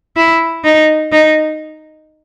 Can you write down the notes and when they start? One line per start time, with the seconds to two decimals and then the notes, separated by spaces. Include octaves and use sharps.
0.16 E4
0.64 D#4
1.12 D#4